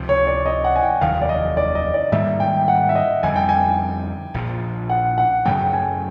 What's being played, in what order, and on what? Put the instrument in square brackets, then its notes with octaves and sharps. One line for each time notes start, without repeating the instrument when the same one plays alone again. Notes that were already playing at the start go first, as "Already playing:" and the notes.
Already playing: [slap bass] C#2 C3 F3
[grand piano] C#5
D5
D#5
F#5
G#5
G5
[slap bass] F1 D#2 D#3 F#3 [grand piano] F5
[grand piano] D5
D#5
D5
D#5
D5
[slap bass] G#2 D#3 G3 A#3 [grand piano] E5
[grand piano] G5
F#5
E5
D#5
[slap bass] F2 D3 G3 [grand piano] G#5
[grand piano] G5
G#5
[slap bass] A#1 A#2 F3
[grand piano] F#5
F#5
[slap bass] F#2 C#3 F#3 A3 [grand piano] G5
[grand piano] G#5